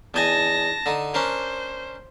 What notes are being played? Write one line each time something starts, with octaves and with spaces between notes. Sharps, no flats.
E2 D#5 G#5 A5 A#6
D3 D#4
C#4 D4 A#4 C5